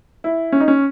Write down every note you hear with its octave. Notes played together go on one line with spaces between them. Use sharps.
E4
C#4
D#4
C#4